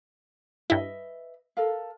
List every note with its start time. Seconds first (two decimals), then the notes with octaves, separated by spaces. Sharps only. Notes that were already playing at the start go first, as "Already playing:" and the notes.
0.70 G2 E4 B4 D#5 E5
1.57 A4 A#4 F5